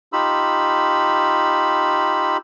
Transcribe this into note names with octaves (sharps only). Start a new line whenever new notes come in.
D#4 F4 G4 B5 E6